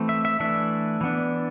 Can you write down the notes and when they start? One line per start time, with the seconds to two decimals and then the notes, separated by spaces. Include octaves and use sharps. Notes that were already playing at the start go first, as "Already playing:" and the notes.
Already playing: E3 A3 C4
0.09 E5
0.25 E5
0.40 E3 A3 D4 E5
1.01 E3 B3 D4